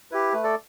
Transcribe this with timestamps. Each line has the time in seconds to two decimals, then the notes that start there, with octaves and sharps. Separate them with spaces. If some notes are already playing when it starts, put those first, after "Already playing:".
0.11 E4 G4 B4
0.33 A3 B4
0.44 A4 D5